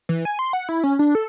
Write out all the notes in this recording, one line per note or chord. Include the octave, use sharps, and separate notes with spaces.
E3
G#5
C6
F#5
E4
C#4
D4
A4